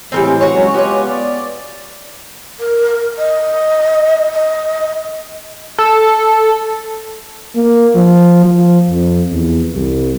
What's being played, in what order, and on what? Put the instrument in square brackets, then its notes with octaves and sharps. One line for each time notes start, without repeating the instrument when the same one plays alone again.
[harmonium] A2 E3 G#3 [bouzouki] G3 A#3 C4
[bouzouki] F#4 C#5
[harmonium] F#3 G#3 C#4
[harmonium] G#3 F4 G4 [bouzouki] B3 C#5
[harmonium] D5
[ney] A#4
D#5
D#5
[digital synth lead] A4
[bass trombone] A#3
F3
F3
F2
E2
C2